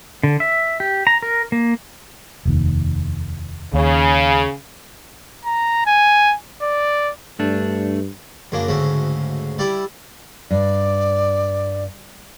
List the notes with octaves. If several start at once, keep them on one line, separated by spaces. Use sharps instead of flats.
D3
E5
G4
A#5
A#4
A#3
F1 D#2
D#2 C#3
A#5
G#5
D5
G2 A3 D4
F#2 C#3 A#3 D4
D2 G#2 C#3 F#4 E5
G3 E4 D5 E5 G5 B5
G2 D5